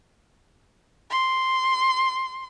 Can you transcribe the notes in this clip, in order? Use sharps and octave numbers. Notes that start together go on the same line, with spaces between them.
C6